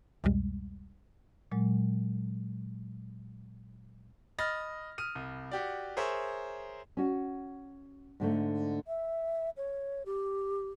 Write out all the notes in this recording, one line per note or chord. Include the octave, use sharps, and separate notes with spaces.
C2 F2 B2 G3 G#3
A#2 F#3 G#3
D#5 B5 F6 A6 A#6
D#6 F6 D#7
C2
F#4 G4 D5
G#4 A#4 C5 C#5 E5
C#4 F#4
G#2 D3 A3
E5
C#5
G4